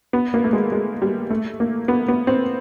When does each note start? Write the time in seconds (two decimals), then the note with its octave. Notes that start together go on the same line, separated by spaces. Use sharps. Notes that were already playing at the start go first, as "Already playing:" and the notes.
0.13 B3
0.34 A#3
0.44 A3
0.53 G#3
0.72 G#3
1.02 G3
1.30 A3
1.60 A#3
1.88 B3
2.08 B3
2.27 C4